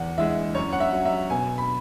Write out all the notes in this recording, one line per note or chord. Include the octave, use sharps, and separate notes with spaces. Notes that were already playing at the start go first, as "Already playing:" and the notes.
Already playing: E2 F#5
E3 G#3 E5
F#2 C#5
F#5
E5
F#3
E5
B2 G#5
B5